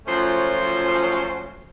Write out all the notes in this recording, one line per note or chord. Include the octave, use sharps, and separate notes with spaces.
F3 F#3 A3 C#4 F4 C5